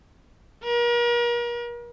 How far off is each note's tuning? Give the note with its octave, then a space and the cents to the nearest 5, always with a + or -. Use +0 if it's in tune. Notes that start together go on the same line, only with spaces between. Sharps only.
A#4 +40